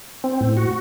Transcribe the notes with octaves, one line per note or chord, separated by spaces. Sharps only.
C4
A2
F#4